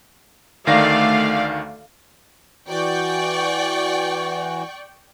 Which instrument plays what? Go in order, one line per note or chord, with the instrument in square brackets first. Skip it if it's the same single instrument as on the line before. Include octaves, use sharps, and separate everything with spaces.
[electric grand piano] D2 D#3 A#6 [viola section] A3 D5 F5
[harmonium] E3 F#4 [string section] D5 G5 C#6